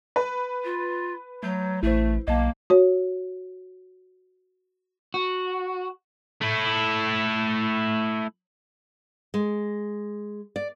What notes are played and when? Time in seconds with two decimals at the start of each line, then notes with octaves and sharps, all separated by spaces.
0.16 B4
0.64 F4
1.43 F#3 A3 G6
1.83 A1 A3 E4 C5
2.28 B1 A#3 D#5 A5
2.70 F#4 C#5
5.14 F#4
6.41 A3 E4
9.34 G#3
10.56 D5